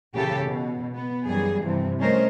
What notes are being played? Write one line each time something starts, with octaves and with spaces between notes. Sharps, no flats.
A#2 C#3 E3 G4 A4
B2
B3
F#2 E3 G3 G#4
G2 C3 E3 F3
G3 A3 C#4 A#4 C5 D#5